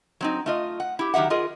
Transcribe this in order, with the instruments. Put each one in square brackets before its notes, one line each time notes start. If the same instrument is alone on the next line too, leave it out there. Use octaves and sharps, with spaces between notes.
[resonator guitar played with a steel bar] F#3 C4 D#4
A3 F4 D#5
F#5
E4 G4
D#3 F#3 G4 E5 F#5
F4 G#4 A#4 D#5